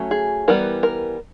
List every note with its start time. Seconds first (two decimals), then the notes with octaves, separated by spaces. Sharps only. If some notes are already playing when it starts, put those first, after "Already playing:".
Already playing: F#3 A3 C#4
0.11 G#4
0.48 E3 G3 B3 A#4
0.83 A#4